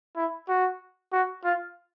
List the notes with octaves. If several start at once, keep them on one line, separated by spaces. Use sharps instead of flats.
E4
F#4
F#4
F4